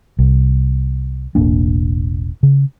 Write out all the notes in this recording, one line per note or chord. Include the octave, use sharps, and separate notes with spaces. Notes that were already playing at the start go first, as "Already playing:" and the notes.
C2
E1 A1 A#3 D4
C#3